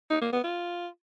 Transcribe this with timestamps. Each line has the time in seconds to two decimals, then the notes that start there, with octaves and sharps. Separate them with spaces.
0.10 D#4
0.22 A#3
0.33 B3
0.44 F4